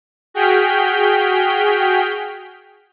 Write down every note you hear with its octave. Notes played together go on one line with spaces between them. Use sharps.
F#4 G#4 G5 F6 G6 B6